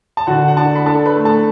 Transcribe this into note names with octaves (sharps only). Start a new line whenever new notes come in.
A5
D3 F#4 F#5
F#5
D4 A4 A5
B5
D4 A4 A5
B4 B5
A3
A4 A5